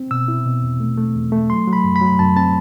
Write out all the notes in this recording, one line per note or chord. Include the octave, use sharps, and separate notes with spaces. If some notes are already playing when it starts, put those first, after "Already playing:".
Already playing: C4
B2 E6
E4
B2
E2
A3
A3
E2
A3
F#3 C6
F#3
B5
F#2
B5
F#3
F#2 A5
C4 A5